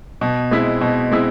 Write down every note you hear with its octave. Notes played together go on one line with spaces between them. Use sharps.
B2
G#3 C4 E4
B2
G#3 C4 E4